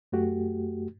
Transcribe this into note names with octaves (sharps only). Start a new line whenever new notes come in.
F#2 A3 F#4 G4